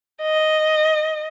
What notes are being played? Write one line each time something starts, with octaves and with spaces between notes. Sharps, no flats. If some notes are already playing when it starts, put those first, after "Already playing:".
D#5